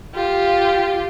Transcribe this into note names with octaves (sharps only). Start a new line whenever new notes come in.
F4 G4